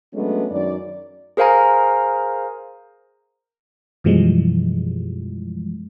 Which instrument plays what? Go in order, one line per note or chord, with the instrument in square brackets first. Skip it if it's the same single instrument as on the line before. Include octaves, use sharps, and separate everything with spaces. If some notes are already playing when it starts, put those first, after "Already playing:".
[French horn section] F#3 G#3 A3 B3 C#4 D4
F#2 D#3 D5
[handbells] G#4 A#4 C5 F5 G#5 A#5
[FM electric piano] F#2 B2 E3 F3 G3 G#3